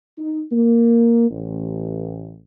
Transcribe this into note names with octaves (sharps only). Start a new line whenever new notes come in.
D#4
A#3
A1